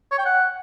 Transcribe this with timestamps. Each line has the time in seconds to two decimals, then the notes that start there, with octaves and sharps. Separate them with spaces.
0.12 C#5
0.18 G5
0.25 F#5